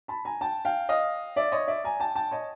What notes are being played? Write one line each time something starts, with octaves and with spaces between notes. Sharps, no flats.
A5 B5
G#5 A#5
G5 A5
F5 G5
D#5 F5
D5 E5
C#5 D#5
D5 E5
G#5 A#5
G5 A5
G5 A5
C#5 D#5